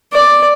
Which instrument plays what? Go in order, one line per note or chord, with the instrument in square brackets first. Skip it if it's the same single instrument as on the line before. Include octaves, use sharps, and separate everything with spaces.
[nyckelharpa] D5